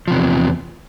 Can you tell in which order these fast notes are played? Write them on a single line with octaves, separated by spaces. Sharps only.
F3 C3 E2